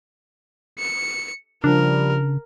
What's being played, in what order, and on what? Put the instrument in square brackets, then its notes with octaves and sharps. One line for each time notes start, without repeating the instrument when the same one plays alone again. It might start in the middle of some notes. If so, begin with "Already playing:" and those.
[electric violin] C#7
[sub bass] C#3 [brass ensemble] F3 G3 [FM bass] D4 [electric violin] A#4